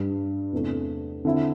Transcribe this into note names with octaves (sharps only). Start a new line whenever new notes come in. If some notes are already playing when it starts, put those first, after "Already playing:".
Already playing: G2 G3 D4
E2 C3 A3 D4
D3 C4 E4